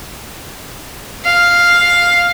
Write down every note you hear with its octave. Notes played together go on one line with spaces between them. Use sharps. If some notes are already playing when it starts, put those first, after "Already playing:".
F5